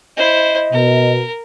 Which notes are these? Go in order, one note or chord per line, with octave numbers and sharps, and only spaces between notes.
E4 C5 D#5
B2 A#4